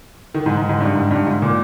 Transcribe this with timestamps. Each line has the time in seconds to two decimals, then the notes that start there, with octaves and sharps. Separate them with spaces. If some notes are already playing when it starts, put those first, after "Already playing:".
0.35 D#3
0.46 G#2
0.57 G#2
0.69 G#2
0.80 G2
0.95 G#2
1.11 G2
1.27 G#2
1.42 A#2